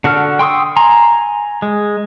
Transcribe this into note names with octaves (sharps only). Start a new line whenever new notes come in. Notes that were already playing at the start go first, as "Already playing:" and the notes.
D3 F#4 A4 F6
G5 C6 C#6 D#6 E6
G#5 A#5 C6
G#3